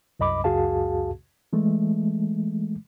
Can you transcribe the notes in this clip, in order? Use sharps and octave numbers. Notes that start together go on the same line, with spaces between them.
C2 F#2 D#5 B5 D6
C#2 F#2 F#4 G#4 F5 A5
E3 G#3 A3